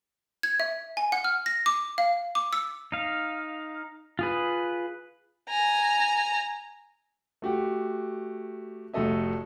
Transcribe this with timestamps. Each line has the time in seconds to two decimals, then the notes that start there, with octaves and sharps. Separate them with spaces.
0.43 G#6
0.60 E5
0.97 G#5
1.12 F#5
1.24 F6
1.46 A#6
1.66 D6
1.98 F5
2.35 D6
2.53 E6
2.92 D#4 F5
4.19 F4 G#4 B4
5.49 G#5 A#5
7.42 A3 F#4 G4
8.93 F1 A2 F#4 A4 D#5 E5